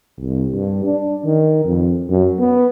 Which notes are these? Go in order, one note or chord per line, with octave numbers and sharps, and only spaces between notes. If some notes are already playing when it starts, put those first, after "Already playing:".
C2
G2
D4
D#3
F2
F#2
B3